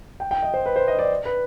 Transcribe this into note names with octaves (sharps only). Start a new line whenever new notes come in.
G5
G5
D#5
C5
B4
C5
D#5
D5
B4